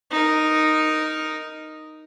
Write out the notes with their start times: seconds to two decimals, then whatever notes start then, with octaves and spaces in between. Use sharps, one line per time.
0.11 D#4 A#4